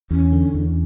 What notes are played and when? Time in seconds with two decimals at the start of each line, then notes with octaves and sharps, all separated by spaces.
0.11 E2 C#4
0.32 D3
0.54 E2